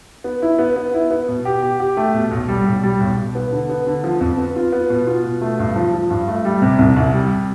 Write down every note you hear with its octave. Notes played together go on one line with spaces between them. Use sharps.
B3
E4
B3
B3
E4
B3
B2
G4
G4
G4
A3
B2
B1
G3
B1
G3
B1
B1
B3
D3
B3
D3
F3
F2
B3
F4
B3
B2
F4
B2
A3
G2
F3
F3
G2
A3
G3
C3
C2
C2
G3